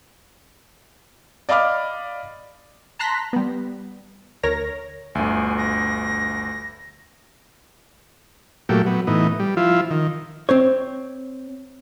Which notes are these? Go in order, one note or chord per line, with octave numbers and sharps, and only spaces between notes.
D5 D#5 F5 B5 D6 F6
A5 A#5 C6 F#6 A#6 B6
G3 B3
D2 A#4 C#5 A#6
G1 D2 G#5
A#6
A#2 F#3 A3 G4
F#3 B3
A2 E3 B3 D#4
G3
F3 E4 F4
D#3
C4 C5 C#5